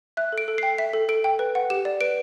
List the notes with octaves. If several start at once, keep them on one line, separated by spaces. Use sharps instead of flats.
E5 F#6
A4
D7
A4
C7
G5
E5 B6
A4
A4 D7
G5
B4
F#5
G4 E7
D5
B4 D7